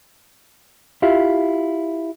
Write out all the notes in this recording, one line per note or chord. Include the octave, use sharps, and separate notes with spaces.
E4 F4 G4 E5 F5